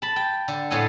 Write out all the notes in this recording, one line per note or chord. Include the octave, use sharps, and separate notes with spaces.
A5 B5
G5
D3
A2 G#3 B3 A4 G#5